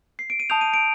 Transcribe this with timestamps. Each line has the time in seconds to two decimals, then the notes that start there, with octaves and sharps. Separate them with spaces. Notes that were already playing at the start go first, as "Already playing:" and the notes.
0.19 C7
0.30 D7
0.40 D#7
0.50 A5 D#6 G6 F7
0.61 D#7
0.74 D7